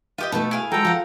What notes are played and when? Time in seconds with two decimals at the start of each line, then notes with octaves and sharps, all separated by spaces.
0.18 F4 G4 D#5 E5
0.32 B2 A3 D#4 F4 A4
0.51 E4 G#4 F5
0.71 F#3 G#3 A4 G5 A#5
0.85 F3 F5 F#5